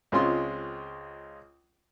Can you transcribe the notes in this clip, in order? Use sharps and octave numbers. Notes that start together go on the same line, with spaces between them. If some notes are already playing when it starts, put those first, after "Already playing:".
C#2 G#3 C4 C#4 F4 C6